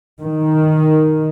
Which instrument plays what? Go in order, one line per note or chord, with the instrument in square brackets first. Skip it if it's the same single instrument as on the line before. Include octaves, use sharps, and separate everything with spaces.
[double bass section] D#3